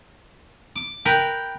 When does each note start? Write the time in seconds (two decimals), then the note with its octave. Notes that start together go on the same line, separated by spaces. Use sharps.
0.76 D6
1.06 A#4 B4 G5